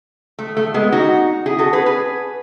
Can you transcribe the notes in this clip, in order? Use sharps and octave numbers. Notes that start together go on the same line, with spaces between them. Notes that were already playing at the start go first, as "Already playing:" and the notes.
A3
A3
G#3 B3
D#4 F#4
E4 G#4
F#4 A4
G#4 B4
G#4 B4